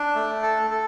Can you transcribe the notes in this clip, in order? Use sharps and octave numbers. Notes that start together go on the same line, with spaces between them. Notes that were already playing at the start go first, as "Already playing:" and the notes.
Already playing: D4
A3
A4
A4